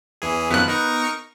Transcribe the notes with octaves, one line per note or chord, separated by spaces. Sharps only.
E2 E3 G#4
F#2 D#3 F3 B3 F#6
D#4 A#4 C#6